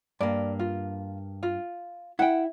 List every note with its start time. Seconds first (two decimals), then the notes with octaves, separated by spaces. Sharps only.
0.21 G2 A#3 D5
0.59 F4
1.43 F4
2.19 E4 F#5 G5